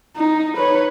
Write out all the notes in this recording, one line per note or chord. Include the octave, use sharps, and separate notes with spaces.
D#4
B4 C#5